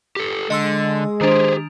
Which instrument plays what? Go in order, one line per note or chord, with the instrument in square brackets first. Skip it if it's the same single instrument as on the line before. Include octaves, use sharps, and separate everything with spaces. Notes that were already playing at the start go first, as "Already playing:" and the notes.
[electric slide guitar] G4 A4
[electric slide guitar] D3 [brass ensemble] G#3 [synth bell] D#5 C6 E6
[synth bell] D#3 D4 F7 [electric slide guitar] G4 G#4 [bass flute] C5